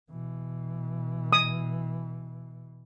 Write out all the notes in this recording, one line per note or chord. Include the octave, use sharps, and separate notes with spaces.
B2 E3
D#6